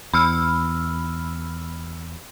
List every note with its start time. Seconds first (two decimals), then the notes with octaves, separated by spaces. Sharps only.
0.14 E2 B5 E6 F6